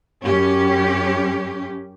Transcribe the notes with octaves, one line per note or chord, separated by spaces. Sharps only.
F#2 C#4 G4